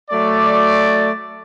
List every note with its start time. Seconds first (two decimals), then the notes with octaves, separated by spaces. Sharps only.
0.11 F#3 A3 D5